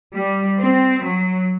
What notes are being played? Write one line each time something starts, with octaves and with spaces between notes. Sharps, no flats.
G3
C4
F#3